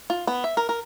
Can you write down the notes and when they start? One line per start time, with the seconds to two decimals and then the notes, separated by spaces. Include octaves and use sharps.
0.10 F4
0.27 B3
0.44 E5
0.57 A#4
0.69 A#4